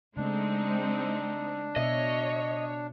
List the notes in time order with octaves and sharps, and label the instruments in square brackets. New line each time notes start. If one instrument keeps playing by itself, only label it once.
[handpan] C#3 A3 [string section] G#3 C4 D#4 [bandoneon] D4
[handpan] B2 E5 [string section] C#5 [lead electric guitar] D#5